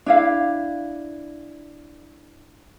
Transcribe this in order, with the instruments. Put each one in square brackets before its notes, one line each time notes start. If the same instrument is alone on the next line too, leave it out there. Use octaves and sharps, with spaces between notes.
[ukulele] D4 E4 F5